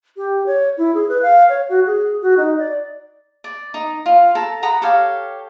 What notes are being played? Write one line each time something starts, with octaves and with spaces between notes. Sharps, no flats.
G4
C#5
E4
G#4
B4
F5
C#5
F#4
G#4
F#4
D#4
D5
D5
D#4
F4
A4 A#5
F#5 A#5 B5 D#6
G4 A4 C#5 F5